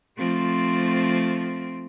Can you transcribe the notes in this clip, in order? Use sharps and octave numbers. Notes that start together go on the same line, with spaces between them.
F3 A3 C4